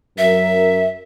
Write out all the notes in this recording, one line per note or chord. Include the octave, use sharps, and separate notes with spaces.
F#2 F#3 A#4 E5